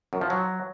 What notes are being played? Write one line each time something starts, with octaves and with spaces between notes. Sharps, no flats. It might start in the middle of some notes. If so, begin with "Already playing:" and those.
F#2
F3
F#3